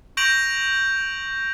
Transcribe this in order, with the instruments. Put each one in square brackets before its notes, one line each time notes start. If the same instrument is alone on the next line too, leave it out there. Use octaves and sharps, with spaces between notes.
[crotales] C#6 G6 A#6 D7 F7 F#7